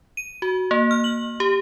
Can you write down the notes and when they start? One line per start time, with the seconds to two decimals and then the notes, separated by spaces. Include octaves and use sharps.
0.17 D#7
0.42 F#4
0.71 A#3
0.91 F6
1.04 F#7
1.40 G4